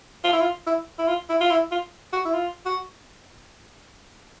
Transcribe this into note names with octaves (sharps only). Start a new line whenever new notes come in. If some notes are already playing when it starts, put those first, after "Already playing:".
F4
E4
F4
E4
E4
F4
E4
F4
E4
F4
F#4
E4
F4
F#4